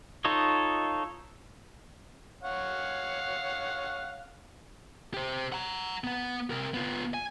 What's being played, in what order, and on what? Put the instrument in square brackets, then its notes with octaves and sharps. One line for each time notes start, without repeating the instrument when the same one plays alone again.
[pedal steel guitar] D#4 F4 A4 C#5 D#5
[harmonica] C#5 F5 F#5
[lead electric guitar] G4 C5
F#5 A#5
B3 F#5
C3 A#4
B3 F4
G#5